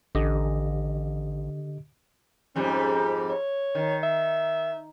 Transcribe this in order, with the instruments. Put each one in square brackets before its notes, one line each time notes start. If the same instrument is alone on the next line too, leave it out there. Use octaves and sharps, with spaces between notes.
[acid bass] A1 [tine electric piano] D3 G4 D#5
[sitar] F2 G#2 G3 [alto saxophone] C#4
[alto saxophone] C#5
[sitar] D#3
[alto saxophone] E5